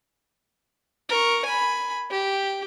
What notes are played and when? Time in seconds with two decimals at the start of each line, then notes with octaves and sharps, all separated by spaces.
1.09 A#4 C#6
1.45 G#5 B5
2.10 G4